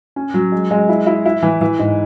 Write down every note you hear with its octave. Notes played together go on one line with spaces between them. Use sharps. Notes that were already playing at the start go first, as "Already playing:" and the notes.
C#4
F#3
G#3
G#3
E4
E4
E4
E3
E3
G#2